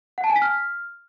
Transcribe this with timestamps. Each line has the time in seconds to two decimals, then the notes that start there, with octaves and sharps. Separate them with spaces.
0.18 F#5
0.24 A5
0.30 G#5
0.36 B6
0.42 F6